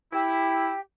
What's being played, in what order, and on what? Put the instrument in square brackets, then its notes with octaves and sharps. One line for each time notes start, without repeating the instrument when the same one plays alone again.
[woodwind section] E4 [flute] G4